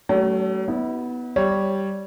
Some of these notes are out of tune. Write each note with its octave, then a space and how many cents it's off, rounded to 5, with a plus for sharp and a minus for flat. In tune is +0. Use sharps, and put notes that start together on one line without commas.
F#3 +45 A3 +0 C#4 +5
B3 +0 E4 -45
G3 -5 C#5 +0